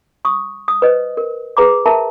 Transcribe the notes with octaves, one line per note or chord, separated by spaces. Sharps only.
C#6 D#6
D#6
B4 C5 D#5
A#4
G#4 B4 A#5 D6
A#4 E5 A5 A#5